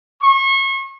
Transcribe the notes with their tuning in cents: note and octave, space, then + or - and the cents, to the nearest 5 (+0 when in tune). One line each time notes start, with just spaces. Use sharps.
C#6 -35